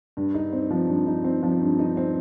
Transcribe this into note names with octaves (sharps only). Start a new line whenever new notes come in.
G2
D#4
C4
F3
G2
D#4
C4
F3
G2
D#4
C4